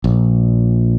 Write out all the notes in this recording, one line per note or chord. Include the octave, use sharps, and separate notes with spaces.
A#1